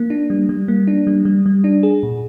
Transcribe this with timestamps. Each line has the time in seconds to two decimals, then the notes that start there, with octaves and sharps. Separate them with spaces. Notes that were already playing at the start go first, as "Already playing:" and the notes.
Already playing: A#3
0.10 D4
0.30 G3
0.49 G3
0.68 A#3
0.87 D4
1.07 G3
1.25 G3
1.46 G3
1.64 D4
1.83 G#4
2.03 A#2